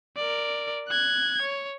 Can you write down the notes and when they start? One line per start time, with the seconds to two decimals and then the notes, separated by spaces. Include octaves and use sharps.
0.16 A#4 D5
0.88 F#6 G#6
1.42 C#5